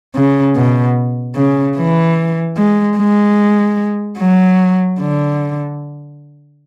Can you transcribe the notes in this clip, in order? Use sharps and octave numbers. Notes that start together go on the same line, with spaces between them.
C#3
B2
C#3
E3
G#3
G#3
F#3
D3